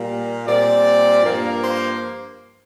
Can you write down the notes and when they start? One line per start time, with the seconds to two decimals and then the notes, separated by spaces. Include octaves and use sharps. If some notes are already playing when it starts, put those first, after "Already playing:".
Already playing: A#2 G3 A#3
0.46 A#2 G3 C4 D5
1.23 G2 F3 A#3
1.62 C5